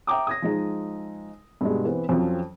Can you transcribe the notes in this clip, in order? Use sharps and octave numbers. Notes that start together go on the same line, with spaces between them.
E5 G5 A#5 D6 D#6
D#6 G#6 A#6
F3 G#3 D#4
G2 B2 G#3
E3 B3 C4
F2 F3 F#3 C4 C#4